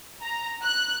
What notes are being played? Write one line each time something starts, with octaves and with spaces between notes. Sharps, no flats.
A#5
F#6